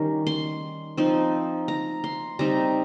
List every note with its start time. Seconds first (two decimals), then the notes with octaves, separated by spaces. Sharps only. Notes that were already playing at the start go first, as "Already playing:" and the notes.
Already playing: D#3 G3 C#4 A#5
0.27 C6
0.97 F3 C4 D#4
1.68 A#5
2.04 C6
2.39 G3 C4 D#4 A#5